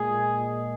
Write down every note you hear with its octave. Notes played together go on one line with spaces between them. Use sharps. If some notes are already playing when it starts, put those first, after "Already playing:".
Already playing: A#2 G#3 G#4